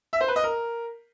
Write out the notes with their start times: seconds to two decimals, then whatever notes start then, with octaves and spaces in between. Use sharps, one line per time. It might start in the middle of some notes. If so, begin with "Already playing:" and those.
0.13 E5
0.21 C5
0.28 B4
0.36 D#5
0.44 A#4